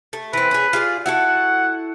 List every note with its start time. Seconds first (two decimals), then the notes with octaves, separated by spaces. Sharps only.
0.13 A3
0.33 E3 C4 B4
0.51 C#4 G#4
0.73 F4 G#4 D5
1.06 E4 F#4 A4 F#5